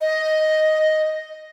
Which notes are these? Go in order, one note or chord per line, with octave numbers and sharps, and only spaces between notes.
D#5